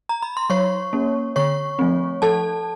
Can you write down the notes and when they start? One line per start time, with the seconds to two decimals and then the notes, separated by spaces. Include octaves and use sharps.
0.09 A#5
0.22 B5
0.37 C6
0.50 F#3 C#5 C#6
0.93 A#3 C#4
1.36 D3 C#5 C#6
1.79 F3 A3 C4
2.22 F3 A4 A5